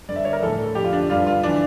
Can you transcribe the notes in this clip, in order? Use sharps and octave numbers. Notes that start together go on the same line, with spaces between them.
G2 D3 D5
E5
C#5
A#4
A2 E3 A4
F2 D3 G4
F4
D4
G2 D3 F4
F4
E3 D4